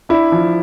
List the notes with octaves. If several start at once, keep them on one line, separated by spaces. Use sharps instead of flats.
D4 E4
F3